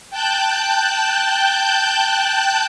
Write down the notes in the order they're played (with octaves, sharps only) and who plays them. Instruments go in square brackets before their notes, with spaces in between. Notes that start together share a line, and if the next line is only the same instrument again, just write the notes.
[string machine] G5 A5 F#6 G6